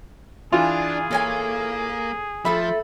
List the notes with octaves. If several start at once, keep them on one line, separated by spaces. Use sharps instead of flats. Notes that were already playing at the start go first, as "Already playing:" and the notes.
E3 D4 F4 G#4
A#3 A4 C#5 G#5
F3 A3 A4 E5 B5